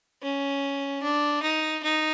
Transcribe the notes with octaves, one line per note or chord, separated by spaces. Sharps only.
C#4
D4
D#4
D#4